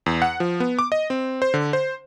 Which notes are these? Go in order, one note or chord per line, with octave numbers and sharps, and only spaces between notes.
E2
F#5
F3
B3
D6
D#5
C4
C5
D3
C5